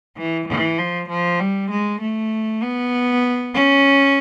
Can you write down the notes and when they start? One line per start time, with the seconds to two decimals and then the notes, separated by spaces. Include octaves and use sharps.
0.17 E3
0.48 E3
0.78 F3
1.09 F3
1.40 G3
1.70 G#3
2.01 A3
2.62 B3
3.54 C#4